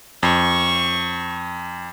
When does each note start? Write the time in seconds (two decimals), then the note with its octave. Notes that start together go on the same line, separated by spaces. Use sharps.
0.23 F2 C#6